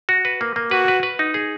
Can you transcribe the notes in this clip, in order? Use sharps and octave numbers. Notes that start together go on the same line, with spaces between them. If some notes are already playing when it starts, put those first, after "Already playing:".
F#4
B4
A#3
A#3
F#4 B4
B4
B4
D#4
G#4